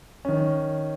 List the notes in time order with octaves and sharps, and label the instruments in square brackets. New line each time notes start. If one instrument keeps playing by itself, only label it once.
[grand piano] D#3 C#4